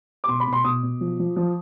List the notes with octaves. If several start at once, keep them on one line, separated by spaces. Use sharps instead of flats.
D6
B2 C6
B5
B2
C6
B2 D#6
B2
F3
F3
F3